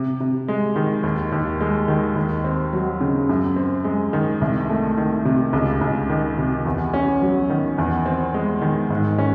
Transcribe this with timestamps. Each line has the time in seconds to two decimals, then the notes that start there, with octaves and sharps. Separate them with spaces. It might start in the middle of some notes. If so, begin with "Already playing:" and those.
Already playing: C3
0.20 C3
0.48 G#3
0.76 D#3
1.03 D#2
1.32 D#2
1.61 G#3
1.88 D#3
2.16 D#2
2.44 C4
2.73 F#3
3.01 C#3
3.29 F#2
3.56 C4
3.84 G#3
4.13 D#3
4.41 C2
4.69 A3
4.97 D#3
5.25 C3
5.53 C#2
5.81 C#2
6.10 D#3
6.38 C3
6.66 E2
6.94 C#4
7.22 F#3
7.50 D#3
7.78 E2
8.06 C4
8.34 G#3
8.62 D#3
8.90 G#2
9.18 C#4